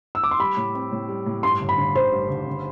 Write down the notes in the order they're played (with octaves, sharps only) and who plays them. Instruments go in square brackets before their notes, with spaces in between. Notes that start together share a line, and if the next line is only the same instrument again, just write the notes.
[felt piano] E6
D6
C6
[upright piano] G3 [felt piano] B5
[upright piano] A2
C4
A2
G3
A2
[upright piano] G2 [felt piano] C6
[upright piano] G1
[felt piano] B5
[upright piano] D3
[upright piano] G1 [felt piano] C5
[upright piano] G2
G1
D3